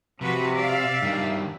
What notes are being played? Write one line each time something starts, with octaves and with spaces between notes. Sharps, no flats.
C3 F3 F#4 B4
D5 E5 F5
G2 D#3